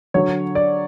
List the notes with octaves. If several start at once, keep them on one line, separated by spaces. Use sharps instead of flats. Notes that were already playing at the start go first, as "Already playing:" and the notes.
D3 F#3 C#5
D5